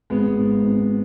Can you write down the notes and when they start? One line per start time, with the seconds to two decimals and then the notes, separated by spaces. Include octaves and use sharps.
0.10 G#1 G#3 B3
0.38 G#2
0.64 G#1